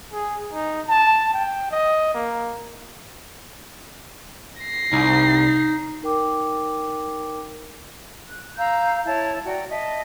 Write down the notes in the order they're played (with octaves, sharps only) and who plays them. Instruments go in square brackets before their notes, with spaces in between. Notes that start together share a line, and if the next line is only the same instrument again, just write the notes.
[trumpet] G#4
D#4
A5
G5
D#5
A#3
[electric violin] A#6 C7
[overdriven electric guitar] C2 [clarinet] D#4
[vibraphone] D#4 A#4 G5 D6
[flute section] F#6
F5 A#5 E6 G6
E4 C#5 A5
F#4 D5 G5 A#5
D#5 E5 A5